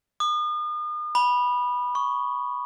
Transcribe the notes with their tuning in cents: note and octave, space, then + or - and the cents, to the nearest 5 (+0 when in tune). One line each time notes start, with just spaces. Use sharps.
D#6 -40
B5 -10
C#6 +5